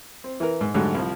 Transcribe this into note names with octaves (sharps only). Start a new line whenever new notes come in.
C4
E3 A#4
G#2
G#2 D3 F#3 G3 A3
C2 F3